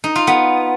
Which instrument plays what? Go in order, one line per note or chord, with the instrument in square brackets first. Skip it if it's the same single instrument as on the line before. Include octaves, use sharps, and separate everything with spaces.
[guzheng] D#4
F4
B3